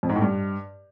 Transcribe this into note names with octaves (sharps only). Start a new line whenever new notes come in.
F2
G#2
A2
G2